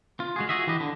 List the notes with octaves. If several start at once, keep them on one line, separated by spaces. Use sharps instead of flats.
F4
G#3 F#4 G#4
F4 F#4 G#4 D#5 E5
E3 G4 B4 D#5
D3